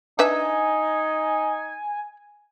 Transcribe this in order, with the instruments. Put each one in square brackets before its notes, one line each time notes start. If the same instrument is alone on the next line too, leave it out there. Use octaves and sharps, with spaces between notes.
[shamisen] D4 B4 E5 [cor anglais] D#4 [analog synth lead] G#5